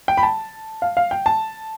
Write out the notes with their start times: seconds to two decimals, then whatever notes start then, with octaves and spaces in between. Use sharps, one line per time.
0.08 G5
0.17 B5
0.23 A5
0.82 F5
0.97 F5
1.11 G5
1.26 A5